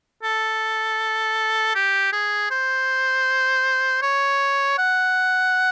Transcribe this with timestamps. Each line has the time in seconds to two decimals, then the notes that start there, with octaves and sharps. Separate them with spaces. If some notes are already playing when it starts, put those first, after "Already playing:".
0.23 A4
1.75 G4
2.13 G#4
2.50 C5
4.02 C#5
4.78 F#5